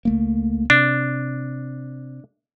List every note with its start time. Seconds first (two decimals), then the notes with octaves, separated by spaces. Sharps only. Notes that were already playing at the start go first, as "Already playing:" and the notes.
0.05 C#2 A3 A#3
0.70 C3 D4